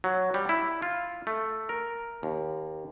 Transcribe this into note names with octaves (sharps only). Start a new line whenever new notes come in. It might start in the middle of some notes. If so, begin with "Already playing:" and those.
F#3
G3
E4
F4
A3
A#4
D#2